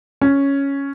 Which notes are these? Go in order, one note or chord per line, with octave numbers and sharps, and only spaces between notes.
C#4